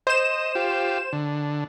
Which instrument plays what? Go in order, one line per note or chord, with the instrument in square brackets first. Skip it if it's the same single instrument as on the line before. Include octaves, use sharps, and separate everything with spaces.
[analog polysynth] C5 E7 [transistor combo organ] D#5
[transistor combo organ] F4 G4
D3